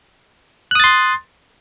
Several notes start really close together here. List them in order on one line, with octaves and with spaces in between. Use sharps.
F#6 D#6 A6 C6